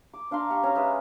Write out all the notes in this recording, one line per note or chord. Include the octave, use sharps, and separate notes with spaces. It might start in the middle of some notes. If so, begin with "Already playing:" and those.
D6
D4 F5 A#5 C6
G4 F5 C#6
C#4 A#5
G#3 B4 E5